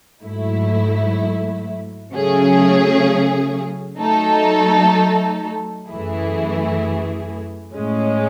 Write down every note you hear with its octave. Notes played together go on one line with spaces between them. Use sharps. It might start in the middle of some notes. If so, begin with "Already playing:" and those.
G#2 F#3 A3 E4
C#3 F#3 A3 C#4 G#4
F#3 A3 D#4 A4
F#2 E3 A3 E4 G#4
A2 G#3 C#4